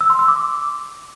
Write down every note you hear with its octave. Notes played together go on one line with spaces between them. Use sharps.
E6
C6
E6
D6